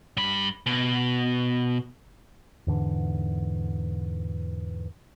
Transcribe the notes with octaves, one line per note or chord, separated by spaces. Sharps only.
G2 B5
B2
E2 G#2 D3 E3